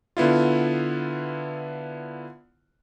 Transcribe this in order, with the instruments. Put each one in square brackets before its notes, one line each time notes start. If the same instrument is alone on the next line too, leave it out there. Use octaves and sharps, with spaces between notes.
[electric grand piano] D3 B3 E4 F4